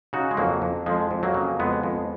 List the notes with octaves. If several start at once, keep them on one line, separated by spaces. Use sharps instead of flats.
C#3 D#4 F#4
G#3
F2 F#3 A#3
F2
F2 F3 G#3
F2
F#3 A#3
C#3
F2 G#3 B3
F2